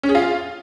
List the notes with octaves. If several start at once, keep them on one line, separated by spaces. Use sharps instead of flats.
C#4
G#4
F4